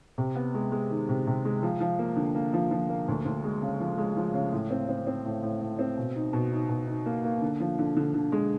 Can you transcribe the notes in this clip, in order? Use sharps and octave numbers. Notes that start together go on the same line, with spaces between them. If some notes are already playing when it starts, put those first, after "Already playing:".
C3
B3
G#3
G#3
D#3
C3
C3
G#3
F3
F3
A#3
D3
A#3
F3
F3
A#3
D2
D2
G#3
C#3
F3
G#3
F3
C#3
A2
C4
C4
C4
A2
A2
A2
C4
B2
D#4
B2
D#4
B2
D#4
A#3
A#3
D3
F3
D3
D3
D3
G#3